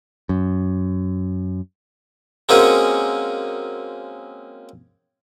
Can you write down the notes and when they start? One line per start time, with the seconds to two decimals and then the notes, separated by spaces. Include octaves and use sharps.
0.29 F#2
2.49 G#3 A#3 C4 C#4 F#4 G#4